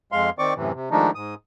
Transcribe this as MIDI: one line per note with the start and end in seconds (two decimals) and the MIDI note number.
0.12 0.30 41
0.12 0.30 56
0.12 0.30 77
0.12 0.30 84
0.39 0.54 51
0.39 0.54 60
0.39 0.54 74
0.39 0.54 85
0.39 0.54 86
0.56 0.72 42
0.56 0.72 45
0.56 0.72 48
0.56 0.72 52
0.74 0.89 48
0.91 1.11 51
0.91 1.11 53
0.91 1.11 56
0.91 1.11 57
0.91 1.11 62
0.91 1.11 63
1.15 1.34 44
1.15 1.34 87